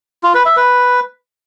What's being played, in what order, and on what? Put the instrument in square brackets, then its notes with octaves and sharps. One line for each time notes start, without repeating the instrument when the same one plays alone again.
[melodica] F4
B4
E5
B4